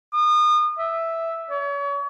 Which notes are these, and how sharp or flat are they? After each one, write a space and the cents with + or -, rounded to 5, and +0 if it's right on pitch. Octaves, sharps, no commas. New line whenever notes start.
D#6 -35
E5 +0
C#5 +35